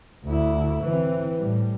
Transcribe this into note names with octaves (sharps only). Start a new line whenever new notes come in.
D2 E4
E3 C4
A2 G3